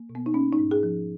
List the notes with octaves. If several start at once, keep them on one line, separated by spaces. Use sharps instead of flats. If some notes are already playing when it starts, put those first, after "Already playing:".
Already playing: A#3
B2
B3
D#4
A#3 C#4
D#4
G#2
G#4
F3